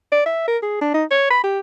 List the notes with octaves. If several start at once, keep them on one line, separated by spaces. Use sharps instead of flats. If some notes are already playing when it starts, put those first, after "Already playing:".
D5
E5
A#4
G#4
D4
D#4
C#5
B5
G4